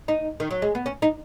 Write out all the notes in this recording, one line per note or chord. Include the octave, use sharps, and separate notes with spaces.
D#4
D#3
F#3
G#3
B3
C#4
D#4